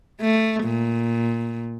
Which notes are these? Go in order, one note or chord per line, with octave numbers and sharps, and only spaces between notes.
A3
A#2